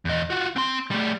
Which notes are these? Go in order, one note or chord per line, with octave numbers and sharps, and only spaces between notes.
E2 D#5
F4 F#4
C4 C6
G3 A3